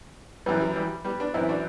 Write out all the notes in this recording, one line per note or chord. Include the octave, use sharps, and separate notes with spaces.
F#2 E3 G3 B3
F#3
E3 G3
G3 B3
B3 D4
F#2 E3 C4 E4
D4 F#4